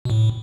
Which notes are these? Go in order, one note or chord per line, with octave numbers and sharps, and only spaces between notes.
B2
A2